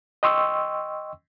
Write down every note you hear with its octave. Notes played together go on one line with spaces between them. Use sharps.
D#5 G5 C6 C#6 E6